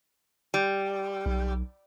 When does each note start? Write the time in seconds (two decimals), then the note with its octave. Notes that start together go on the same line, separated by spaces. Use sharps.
0.54 G3
1.26 B1